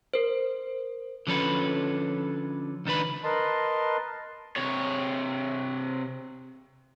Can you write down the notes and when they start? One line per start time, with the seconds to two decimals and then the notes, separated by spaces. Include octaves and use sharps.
0.14 A#4 C5
1.27 D3 F3 C#4 A4 B4
2.86 C#2 D#3 D4 B4 B5
3.24 A#4 B4 D#5 A5 C6
4.56 C3 C#5